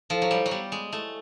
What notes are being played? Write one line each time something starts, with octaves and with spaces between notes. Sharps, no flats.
F3 E4 A4 C5 F5
F#3
G3
F#3
G3 B3
G#3
A3 E4 A4